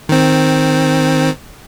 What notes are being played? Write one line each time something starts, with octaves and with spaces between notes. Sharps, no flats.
D#3 C4